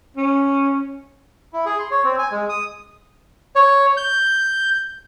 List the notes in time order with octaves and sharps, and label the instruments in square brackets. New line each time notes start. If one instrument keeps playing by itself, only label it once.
[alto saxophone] C#4
[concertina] E4
G#4
C6
C#5
C4
G#5
G#3
D#6
[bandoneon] C#5
G6